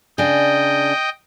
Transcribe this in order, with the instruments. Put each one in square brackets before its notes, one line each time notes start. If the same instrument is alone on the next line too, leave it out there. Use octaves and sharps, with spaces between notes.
[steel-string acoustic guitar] C#3 D4 [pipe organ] D#5 G5